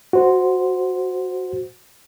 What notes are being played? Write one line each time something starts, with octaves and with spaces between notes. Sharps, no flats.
F#4 C5